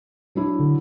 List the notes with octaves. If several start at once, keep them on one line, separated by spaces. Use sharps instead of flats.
F#3 D4 E4
D3